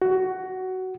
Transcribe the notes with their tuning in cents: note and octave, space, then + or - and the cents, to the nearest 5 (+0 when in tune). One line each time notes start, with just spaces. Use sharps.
F#4 +15